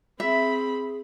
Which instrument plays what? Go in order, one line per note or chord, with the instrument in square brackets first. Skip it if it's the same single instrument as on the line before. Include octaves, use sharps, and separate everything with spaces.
[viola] C4 B5 [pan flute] G#4 [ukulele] E5